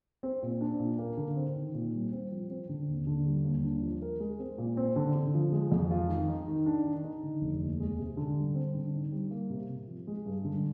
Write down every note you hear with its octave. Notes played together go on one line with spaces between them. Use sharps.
C4
A#2
D4
A#2
A#3
D3
C4
D#3
A#2
G3
C4
F3
C4
D3
D#2
D3
G3
D#2
D4
F3
A#4
G#3
C4
A#2
C4
D3
D3
F3
G#3
F2
F4
D#3
D#4
D#3
D4
D#3
D#4
D3
F1
D#2
G#3
C3
D3
G3
C4
D3
D#4
G3
A#3
C3
C3
F3
G#3
G2
D3